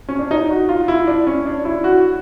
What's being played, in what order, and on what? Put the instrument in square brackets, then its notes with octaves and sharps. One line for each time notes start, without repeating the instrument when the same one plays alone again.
[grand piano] C#4
D4
D#4
F#4
F4
E4
D4
C#4
D4
E4
F#4